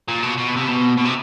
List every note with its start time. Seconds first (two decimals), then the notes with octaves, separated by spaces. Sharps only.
0.08 A#2
0.23 B2
0.38 B2
0.57 C3
0.68 B2
0.98 B2
1.05 C3